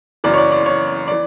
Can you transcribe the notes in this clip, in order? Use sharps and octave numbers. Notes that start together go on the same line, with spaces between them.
F#1 F#2 E3 D5
C#5
D5
D5
C#5
E3 D5